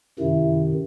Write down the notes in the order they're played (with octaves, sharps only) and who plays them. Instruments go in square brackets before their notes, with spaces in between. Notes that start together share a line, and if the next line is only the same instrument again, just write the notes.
[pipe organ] F#2 C3 D#3 [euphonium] E4